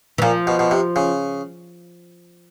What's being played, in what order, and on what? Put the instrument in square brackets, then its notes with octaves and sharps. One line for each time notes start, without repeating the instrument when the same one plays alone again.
[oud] E3
[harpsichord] A#2 [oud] F3
[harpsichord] B2
B2
C3
C#3